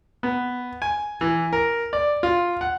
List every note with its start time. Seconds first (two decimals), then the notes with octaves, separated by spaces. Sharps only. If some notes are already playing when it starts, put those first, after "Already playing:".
0.23 B3
0.82 G#5
1.21 E3
1.53 A#4
1.93 D5
2.23 F4
2.61 F#5